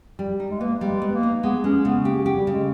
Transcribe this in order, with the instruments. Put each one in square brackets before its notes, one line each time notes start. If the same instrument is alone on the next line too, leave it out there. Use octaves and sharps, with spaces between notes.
[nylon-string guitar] G3
D#4
[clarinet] G#3
[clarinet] A#3 [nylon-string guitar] B3
[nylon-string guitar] G3 [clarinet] G#3
[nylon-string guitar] B3
[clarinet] A#3
[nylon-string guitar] D#4
[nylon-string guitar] G#3 [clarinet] B3
[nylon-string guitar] G#3 [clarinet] C#4
[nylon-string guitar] C#3 [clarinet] B3
[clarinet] A#3 [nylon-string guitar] G4
[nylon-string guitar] G4
[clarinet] G3
[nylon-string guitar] C#3
[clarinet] G#3